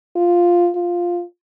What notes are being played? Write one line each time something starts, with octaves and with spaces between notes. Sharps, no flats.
F4
F4